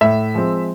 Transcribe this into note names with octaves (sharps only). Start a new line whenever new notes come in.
A2 E5
F3 G#3 C4